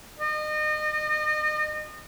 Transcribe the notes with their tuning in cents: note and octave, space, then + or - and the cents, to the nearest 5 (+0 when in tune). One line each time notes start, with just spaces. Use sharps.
D#5 -35